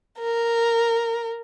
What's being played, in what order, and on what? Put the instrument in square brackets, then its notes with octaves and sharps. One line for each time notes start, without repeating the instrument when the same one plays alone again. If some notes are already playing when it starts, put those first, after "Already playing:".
[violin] A#4